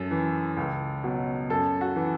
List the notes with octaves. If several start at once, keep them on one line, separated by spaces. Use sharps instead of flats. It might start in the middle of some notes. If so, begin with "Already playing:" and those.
Already playing: F#2 A4
E3
C#2
B2 F#3
F#2 A4
F#4
E3